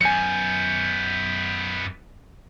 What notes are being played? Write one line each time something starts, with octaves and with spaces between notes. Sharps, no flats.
F#2 B3 G#5 G6 C#7